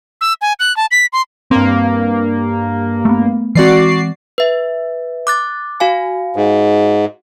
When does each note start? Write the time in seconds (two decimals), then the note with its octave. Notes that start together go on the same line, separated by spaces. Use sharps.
0.21 E6
0.41 G#5
0.60 F#6
0.77 A5
0.91 B6
1.13 C6
1.51 G2 A#3 C4
3.05 A3 B3
3.55 E3 G#3 C4 F#4 D5 C7
4.38 B4 E5
5.27 D6 F#6 A6
5.80 F#4 F5 G#5
6.36 G#2